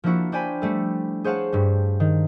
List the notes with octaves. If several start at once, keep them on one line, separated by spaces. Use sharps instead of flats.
F3 A#3 D4 E4 F#4
D4 C5 D5 G5 G#5 B5
G3 A3 A4
G#4 C5 C#5 F5 F#5 A5
G2 G3
D#3